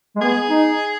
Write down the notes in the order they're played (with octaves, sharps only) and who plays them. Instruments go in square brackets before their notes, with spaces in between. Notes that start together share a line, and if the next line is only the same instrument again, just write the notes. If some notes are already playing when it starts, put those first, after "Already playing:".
[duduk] G#3
[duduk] B3 [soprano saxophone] G#4
[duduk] D#4